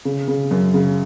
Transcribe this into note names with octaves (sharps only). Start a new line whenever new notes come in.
C#3
C#3
F#2
C#3